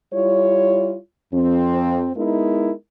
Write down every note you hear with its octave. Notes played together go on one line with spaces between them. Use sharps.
G3 E4 F4 C#5
F2 C4
G#3 B3 D#4 E4 A#4